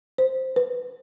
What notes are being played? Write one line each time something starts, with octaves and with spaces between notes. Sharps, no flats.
C5
B4